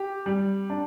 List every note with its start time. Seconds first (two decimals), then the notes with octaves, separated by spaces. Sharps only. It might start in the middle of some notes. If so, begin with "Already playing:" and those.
Already playing: G4
0.26 G3
0.70 D4